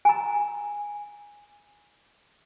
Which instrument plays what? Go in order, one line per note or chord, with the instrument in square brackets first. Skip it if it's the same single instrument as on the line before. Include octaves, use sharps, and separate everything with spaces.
[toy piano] G#5 A#5